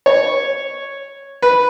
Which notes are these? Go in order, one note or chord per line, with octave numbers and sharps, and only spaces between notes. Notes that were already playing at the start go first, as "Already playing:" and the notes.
C#5
B4